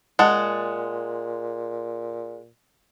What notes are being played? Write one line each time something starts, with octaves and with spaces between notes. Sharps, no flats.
A#2 G#3 F#5 A5